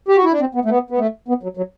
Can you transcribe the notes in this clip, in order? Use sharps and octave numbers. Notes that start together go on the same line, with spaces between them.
G4
F#4
E4
D4
C4
B3
A3
B3
B3
A3
B3
F#3
F#3